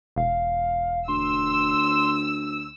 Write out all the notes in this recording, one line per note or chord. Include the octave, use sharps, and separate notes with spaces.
E1 F5
D2 C6 E6